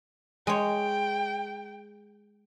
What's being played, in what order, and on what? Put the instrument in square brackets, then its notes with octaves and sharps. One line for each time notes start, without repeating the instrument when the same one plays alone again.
[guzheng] G#3 C#5 [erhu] G5